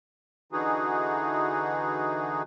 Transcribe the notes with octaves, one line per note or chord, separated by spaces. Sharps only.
D3 E3 D#4 F#4 G#4